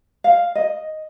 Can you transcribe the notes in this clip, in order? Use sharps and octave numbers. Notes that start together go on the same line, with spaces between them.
F5
D#5